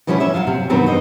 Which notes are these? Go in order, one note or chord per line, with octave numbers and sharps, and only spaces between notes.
B2 F3 G3 C#4 E4 C#5
C#4 E5
F#3 G3 F4 F5
C3
G2 D#3 E3 F#3 B3 C4
C5 D#5